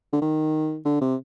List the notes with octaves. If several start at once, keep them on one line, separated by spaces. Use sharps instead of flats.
D3
D#3
D3
C3